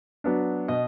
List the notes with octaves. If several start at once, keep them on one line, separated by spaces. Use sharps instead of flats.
F#3 B3 D4
B2 D#5